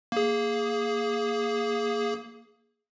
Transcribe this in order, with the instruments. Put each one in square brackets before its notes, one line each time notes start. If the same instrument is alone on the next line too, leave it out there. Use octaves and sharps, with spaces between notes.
[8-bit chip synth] A#3 G#4